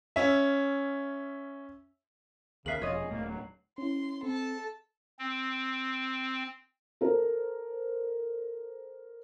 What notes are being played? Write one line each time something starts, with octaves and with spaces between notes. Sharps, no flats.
C#4 E5
D#2 C#3 A#4 B4 E5 C7 F#7
E1 F3 F4 C#5 D#5
G#4
D#1 A#2 A3 A#3
F#3
C#4 E4 C6
C4 A4 A5
C4
A4 A#4 C5